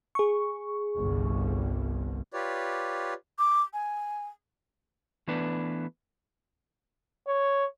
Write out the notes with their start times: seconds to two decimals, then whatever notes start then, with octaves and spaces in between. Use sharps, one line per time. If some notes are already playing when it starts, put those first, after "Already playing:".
0.15 G#4 C#6
0.97 G1 C2
2.32 F4 G4 B4 C#5 D5
3.39 D6
3.73 G#5
5.28 E3 A3 B3 D4 B4
7.27 C#5